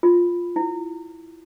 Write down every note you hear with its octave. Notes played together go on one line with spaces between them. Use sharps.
F4
E4